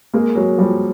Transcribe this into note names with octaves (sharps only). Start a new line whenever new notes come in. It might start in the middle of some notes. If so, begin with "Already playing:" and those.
G#3 A#3
F#3 G#3
F3 G3